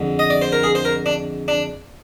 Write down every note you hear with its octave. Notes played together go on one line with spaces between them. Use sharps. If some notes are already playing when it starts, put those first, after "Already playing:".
Already playing: F2 D3 G#3
D#5
D5
C5
A#4
G#4
C5
A#4
D4
D4